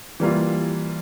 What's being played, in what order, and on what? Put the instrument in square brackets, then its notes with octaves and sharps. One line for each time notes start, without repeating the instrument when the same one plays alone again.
[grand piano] E3 G3 A#3 F4